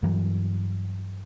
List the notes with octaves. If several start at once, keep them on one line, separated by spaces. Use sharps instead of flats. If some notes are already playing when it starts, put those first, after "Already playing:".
G2 E3 F#3